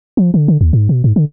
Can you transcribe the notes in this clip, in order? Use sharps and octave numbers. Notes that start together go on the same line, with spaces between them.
F3
D3
D3
D#2
G#2
B2
G#2
D3